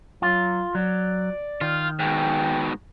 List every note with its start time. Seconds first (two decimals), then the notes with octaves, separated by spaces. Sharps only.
0.22 F#3 F4
0.75 F#3 D5
1.61 D#3 F4
2.00 G#2 B2 G5